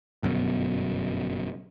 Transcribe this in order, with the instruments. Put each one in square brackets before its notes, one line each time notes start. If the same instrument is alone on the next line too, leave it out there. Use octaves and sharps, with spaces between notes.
[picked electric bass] G1 F#2 B2